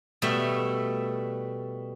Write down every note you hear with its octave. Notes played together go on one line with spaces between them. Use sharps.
B2 G3 A3 E5